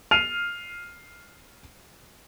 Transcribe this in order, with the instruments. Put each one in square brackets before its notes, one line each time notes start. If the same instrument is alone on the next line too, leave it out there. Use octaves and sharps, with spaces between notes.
[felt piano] F6 [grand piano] C7 D#7 F7